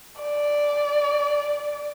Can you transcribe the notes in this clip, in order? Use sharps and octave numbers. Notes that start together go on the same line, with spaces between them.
D5